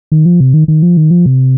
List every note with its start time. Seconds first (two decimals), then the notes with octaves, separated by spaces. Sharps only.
0.12 D#3
0.26 F3
0.40 C3
0.54 D#3
0.68 D#3
0.83 F3
0.97 D#3
1.11 F3
1.26 C3